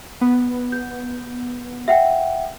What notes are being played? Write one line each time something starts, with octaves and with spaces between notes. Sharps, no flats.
B3
G6
E5 F#5 G5